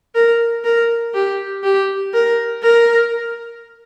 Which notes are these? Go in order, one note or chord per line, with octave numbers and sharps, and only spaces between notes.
A#4
A#4
G4
G4
A#4
A#4